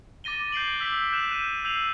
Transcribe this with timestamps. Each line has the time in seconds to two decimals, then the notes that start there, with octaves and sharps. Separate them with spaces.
0.24 D6 A6 A#6 D#7 G7
0.52 G6 C7 D7 F#7
0.79 D6 E6 B6
1.12 F#6 G6 E7
1.29 D#7 E7
1.64 E6 G6 C7 D#7 F7 F#7